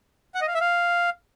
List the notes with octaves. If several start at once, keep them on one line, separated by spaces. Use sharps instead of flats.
F#5
D#5
F5
E5
F5